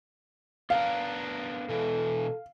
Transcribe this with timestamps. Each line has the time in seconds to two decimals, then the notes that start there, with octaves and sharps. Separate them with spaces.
0.70 B3 D4 A#4 F5
1.69 B2 E3 A4